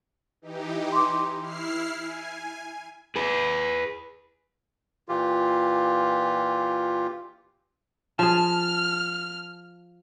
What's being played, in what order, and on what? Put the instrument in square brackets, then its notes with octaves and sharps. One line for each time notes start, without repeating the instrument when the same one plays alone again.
[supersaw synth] E3 D#4 G4
[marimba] C6 D6
[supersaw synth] E4 F6 C7
G#5
[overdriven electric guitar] G#4 B4
[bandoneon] A#2 E3 F4 G4
[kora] F3 G#4 [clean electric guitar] A5 [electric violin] F6